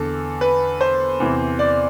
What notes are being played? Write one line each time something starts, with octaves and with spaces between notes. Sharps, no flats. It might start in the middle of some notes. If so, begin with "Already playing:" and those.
Already playing: E2 D3 A4
B4
C5
E2 C3 E3
D5